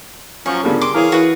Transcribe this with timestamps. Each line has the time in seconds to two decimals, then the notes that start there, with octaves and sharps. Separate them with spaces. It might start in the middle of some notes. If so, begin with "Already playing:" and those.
0.46 F3 F#3 C#4 C#6
0.63 G1 C#3 F3 G3 A#3 A4
0.81 C6 D6
0.94 E3 G#4 A#4 C#5 F5 G#5
1.12 E3 F#4 B4